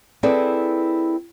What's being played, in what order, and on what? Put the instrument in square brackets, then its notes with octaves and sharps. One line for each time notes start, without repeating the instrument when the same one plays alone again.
[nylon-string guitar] C4 E4 G#4 A4 B4 D5